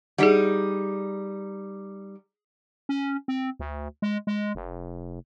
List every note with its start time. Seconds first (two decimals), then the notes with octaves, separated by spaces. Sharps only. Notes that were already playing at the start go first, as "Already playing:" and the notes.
0.18 G3 D#4 G#4 D5 F#5
2.89 C#4
3.28 C4
3.60 D2
4.02 G#3
4.27 G#3
4.55 F1